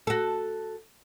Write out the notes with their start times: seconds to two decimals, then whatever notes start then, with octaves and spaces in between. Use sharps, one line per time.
0.07 F#4 A4